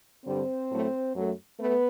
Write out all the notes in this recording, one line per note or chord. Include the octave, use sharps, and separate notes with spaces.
G2 D3 G3 C4 C5
A2 F#3 A3
F#2 F#3 A3
A3 B3 B4